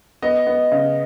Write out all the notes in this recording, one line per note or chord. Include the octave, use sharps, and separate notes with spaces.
B3 D#5
B3
C#3